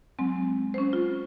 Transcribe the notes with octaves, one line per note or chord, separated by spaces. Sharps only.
F#3 G#3 C4
C#4 C5
F4